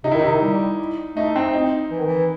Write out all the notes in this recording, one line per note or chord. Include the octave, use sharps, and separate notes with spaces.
C3 D#4
D#3 E4
C3 D#4
D#3
G3
A3 D#4
C4
D#4
E3
D#3
E3